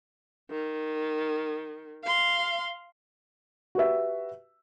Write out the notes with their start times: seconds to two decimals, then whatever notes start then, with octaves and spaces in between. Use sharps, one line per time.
0.51 D#3
2.04 F5 C6
3.75 F#4 G4 B4 E5